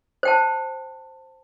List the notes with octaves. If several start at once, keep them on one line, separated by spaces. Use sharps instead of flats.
C5 G5 A5